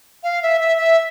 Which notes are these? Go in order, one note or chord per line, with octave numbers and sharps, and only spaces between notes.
F5
E5
E5
E5